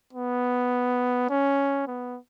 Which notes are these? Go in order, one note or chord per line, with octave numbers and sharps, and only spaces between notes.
B3
C#4
B3